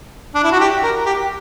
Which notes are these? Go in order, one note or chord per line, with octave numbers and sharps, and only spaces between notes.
D4
E4
F#4
G4
A#4
G4